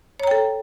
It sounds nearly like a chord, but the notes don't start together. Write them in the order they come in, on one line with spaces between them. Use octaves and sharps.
C#5 A#5 G5 A4